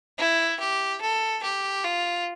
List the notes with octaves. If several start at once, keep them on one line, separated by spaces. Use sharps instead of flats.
E4
G4
A4
G4
F4